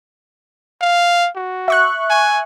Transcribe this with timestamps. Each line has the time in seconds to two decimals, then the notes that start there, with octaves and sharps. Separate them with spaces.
0.81 F5
1.36 F#4
1.68 E5 C#6 F#6
2.10 G#5